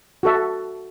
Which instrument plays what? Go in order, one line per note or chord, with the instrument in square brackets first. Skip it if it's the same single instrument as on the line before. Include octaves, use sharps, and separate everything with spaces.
[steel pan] F#4 A4 E5